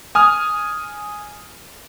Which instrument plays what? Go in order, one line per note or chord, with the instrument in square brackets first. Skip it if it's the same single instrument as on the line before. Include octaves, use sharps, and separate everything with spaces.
[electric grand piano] G#5 D#6 F6